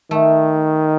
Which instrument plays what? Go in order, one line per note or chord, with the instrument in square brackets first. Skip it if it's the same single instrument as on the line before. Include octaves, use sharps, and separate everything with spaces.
[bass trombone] D#3 [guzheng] A3